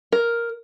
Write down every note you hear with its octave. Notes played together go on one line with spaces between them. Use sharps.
A#4